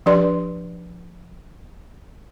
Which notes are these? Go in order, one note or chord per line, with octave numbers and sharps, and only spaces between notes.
F3 D4 G4 B4 D5 C6